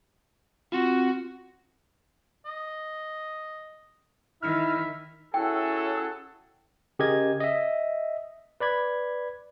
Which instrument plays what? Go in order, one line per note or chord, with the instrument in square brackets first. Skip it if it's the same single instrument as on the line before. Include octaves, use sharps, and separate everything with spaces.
[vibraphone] C4 F4 [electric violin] F#4
[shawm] D#5
[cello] D#3 [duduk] E4 [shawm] E5 [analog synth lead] F6
[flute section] C#4 E4 E6 [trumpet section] F#4 G#4 A4 [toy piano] G5
[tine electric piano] C#3 G4 G#4 A#4 D#5 G#6
D#5 E5
B4 D5 B5 G#6